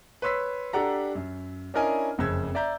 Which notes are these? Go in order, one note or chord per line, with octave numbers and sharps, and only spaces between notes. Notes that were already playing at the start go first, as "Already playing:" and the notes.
B4 C#5 C6 E6 B6
D4 G4 A4 F#5 A#5
F#2
C#4 D4 E4 A#4 D#5 G#5
F#1 F2 C#3 E6 G#6
D5 E5 A#5 G6